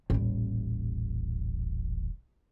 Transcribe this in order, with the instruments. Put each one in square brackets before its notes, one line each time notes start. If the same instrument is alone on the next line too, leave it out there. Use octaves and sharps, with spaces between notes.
[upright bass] D#1 A1